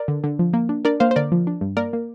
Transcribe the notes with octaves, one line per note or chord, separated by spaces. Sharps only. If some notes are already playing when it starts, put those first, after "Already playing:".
Already playing: A#4 D5
D3
D3
F3
A#3
D4
D4 A#4 D5
A#3 C5 F5
C5
D3 A#4 D5
F3
D4
G2
A#3 A#4 D5
A#3